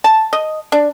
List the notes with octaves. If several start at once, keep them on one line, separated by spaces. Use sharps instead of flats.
A5
D#5
D4